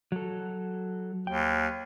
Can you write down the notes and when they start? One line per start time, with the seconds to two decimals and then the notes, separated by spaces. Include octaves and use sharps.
0.12 F#3 A4
1.27 D#2 G5